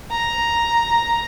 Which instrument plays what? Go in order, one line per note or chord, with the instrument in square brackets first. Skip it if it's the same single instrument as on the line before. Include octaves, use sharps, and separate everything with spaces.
[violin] A#5